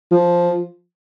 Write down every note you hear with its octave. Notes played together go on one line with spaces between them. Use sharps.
F3